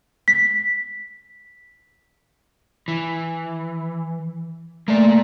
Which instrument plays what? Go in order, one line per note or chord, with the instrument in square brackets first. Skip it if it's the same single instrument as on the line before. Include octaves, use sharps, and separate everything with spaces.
[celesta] B6
[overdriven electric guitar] E3
[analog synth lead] A3 [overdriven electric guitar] A#3 D5